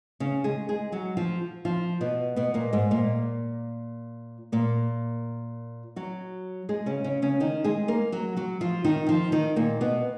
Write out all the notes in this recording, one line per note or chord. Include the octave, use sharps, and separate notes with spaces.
C#3 C#4
G#3 G#4
G#3 G#4
F#3 F#4
F3 F4
F3 F4
B2 B3
B2 B3
A#2 A#3
G#2 G#3
A#2 A#3
A#2 A#3
F#3 F#4
G#3 G#4
C#3 C#4
C#3 C#4
C#3 C#4
D#3 D#4
G#3 G#4
A#3 A#4
F#3 F#4
F#3 F#4
F3 F4
D#3 D#4
F3 F4
D#3 D#4
A#2 A#3
B2 B3